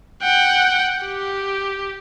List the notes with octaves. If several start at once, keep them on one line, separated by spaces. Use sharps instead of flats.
F#5 G5
G4